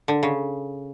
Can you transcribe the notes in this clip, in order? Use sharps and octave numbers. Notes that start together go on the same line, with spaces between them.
D3
C#3